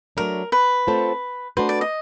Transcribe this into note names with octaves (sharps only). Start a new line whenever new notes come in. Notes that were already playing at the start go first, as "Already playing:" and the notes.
F#3 A3 D4 A#4
B4
A3 C4 F4 A4 C5
A3 D4 F#4 B4 C5
D5
D#5